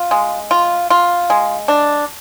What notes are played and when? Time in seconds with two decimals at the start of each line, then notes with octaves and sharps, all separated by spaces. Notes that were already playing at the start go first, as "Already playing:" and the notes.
Already playing: F4
0.11 G#3
0.51 F4
0.90 F4
1.30 G#3
1.68 D4